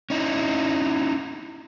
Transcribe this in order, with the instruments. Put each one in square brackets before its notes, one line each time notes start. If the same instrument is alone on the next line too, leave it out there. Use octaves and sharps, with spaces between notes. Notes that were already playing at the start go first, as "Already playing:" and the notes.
[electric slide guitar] C#4 D#4 E4